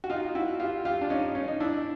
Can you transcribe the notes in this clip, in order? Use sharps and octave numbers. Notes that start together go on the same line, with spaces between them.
F#4
D#4 F4
E4 F#4
F4 G4
F4 G4
D4
C#4 D#4
C#4 D#4
D#4
D4 E4